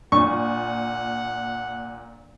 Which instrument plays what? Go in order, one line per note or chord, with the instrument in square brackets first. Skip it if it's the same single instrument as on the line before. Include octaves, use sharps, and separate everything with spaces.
[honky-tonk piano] A#2 [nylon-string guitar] D4 [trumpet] F#5 [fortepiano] C#6